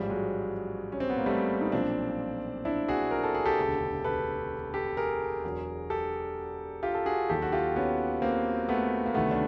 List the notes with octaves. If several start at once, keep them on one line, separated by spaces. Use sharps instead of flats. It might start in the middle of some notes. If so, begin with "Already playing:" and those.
Already playing: A1 G#2 F3 G3
F#3 G#3
C#4
C4
B3
A#3
G3 A3
D#4
B1 A#2 F3 C4 D4
D4 E4
F#4 G#4
A#4
A4
G#4
G4 A4
E1 D2 C#3
A4 B4
G4 A4
G#4 A#4
E1 E2 B2 F#3
G4 A4
F4 G4
A4
F#4 G#4
D#2 D#3 F#3 G4 A4
F#4
F4 G4
B3 C#4
A#3 C4
A3 B3
A#3
D2 C3 D#3 F#3 A3 B3
D4